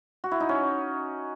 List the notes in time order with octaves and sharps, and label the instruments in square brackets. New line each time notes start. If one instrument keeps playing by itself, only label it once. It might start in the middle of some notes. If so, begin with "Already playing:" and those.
[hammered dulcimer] F#4
E4
D#4
C#4